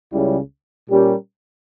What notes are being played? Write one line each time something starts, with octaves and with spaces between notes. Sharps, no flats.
C#2 C#3 G3 C#4 E4
A#2 G3 C#4 G4 A#4